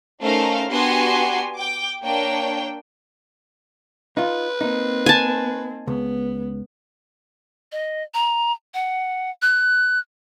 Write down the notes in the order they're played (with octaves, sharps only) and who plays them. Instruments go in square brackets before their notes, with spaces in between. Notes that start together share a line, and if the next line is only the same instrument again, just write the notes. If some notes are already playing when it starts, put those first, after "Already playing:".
[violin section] A3 C#4 D#4 A#4 C5 F5
B3 D4 F#4 G4 G#5 C6
G5 D6
A#3 D4 C#5 G5
[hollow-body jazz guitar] D#4 F4 [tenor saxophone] B4
[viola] A#3 C4 [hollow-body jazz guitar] D#4
[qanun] G#5 A5
[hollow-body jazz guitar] C#2 [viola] B3
[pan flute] D#5
A#5
F#5
F#6